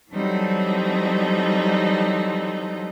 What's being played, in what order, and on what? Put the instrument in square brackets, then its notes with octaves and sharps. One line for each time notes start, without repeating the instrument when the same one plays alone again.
[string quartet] E3 F#3 G3 C4 D#4 A4